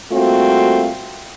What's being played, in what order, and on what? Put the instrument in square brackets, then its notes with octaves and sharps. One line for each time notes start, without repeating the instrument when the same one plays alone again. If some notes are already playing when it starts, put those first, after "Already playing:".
[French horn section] G3 A3 A#3 C4 F4 F#4